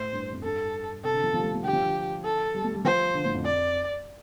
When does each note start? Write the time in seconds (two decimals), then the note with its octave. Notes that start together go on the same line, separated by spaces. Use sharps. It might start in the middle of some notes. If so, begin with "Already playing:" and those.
Already playing: A2 C5
0.13 G2
0.33 F2
0.43 G2 A4
1.04 C3 A4
1.14 D3
1.24 F3
1.34 F3
1.39 G3
1.44 A3
1.55 A3
1.64 D3 G4
1.73 F3
1.82 D3
2.24 A4
2.55 G3
2.64 A3
2.74 G3
2.84 F3 C5
3.14 D3
3.25 A2
3.35 F2
3.45 D5